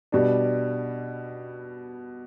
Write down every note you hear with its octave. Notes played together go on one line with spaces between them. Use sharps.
B2 G3 D4